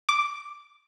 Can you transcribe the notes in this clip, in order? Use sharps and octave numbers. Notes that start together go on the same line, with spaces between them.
D6